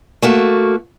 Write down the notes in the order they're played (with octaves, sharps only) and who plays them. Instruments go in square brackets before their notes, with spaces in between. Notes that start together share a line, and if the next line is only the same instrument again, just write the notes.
[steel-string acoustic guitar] A3 A#3 F#4